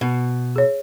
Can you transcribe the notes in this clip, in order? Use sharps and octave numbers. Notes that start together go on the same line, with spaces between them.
B2
G#4 C#5